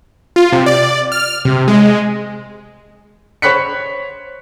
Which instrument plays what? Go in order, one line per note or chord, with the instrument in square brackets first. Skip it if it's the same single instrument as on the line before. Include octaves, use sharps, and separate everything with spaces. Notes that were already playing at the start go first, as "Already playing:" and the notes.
[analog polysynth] F4
C3
D5
F6
C3
G#3
[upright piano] C5 C#5 B5 F#6 B6 C#7